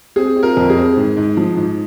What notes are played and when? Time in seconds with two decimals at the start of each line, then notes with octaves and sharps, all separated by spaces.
0.16 C4 G#4
0.36 C4
0.43 F4 A#4
0.57 F2
0.70 G#4
0.77 C4
0.97 G#2
1.17 G#2
1.37 F3
1.57 G#2